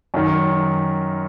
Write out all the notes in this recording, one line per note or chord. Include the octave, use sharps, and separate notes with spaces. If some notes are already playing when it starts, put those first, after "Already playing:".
F#2 D#3